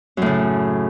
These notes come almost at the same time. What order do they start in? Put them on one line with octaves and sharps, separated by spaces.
F#2 A2 C#3